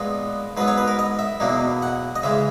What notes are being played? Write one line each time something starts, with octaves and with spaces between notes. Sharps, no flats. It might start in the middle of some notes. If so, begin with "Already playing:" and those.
Already playing: A#2 G#3 B3 D#4 B4
G#2 F#3 B3 B4
C#5
B4
A#4
D#5
E5
E2 B2 F#3 A#3 D#4
F#5
D#5
C#3 E3 G#3 E5